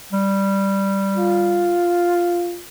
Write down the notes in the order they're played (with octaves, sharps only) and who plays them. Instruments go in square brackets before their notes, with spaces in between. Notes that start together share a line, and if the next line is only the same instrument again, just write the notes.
[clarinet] G3
[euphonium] F4